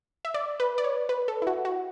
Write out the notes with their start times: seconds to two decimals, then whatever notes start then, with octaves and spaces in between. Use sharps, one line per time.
0.25 E5
0.34 D5
0.60 B4
0.78 D5
0.84 C#5
1.09 B4
1.28 A4
1.42 E4
1.47 F#4
1.65 F#4